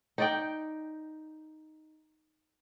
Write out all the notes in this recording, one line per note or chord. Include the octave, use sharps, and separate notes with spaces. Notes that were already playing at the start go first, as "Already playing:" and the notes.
D#4 D5 G5